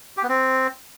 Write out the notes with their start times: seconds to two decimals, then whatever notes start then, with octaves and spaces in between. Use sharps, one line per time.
0.17 G4
0.23 B3
0.29 C4